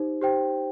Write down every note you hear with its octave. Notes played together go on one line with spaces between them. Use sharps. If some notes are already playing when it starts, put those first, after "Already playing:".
Already playing: D#4 G4 C5
G4 C5 G5